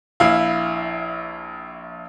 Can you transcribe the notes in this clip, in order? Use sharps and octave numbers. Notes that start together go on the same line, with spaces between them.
A#1 E4 F5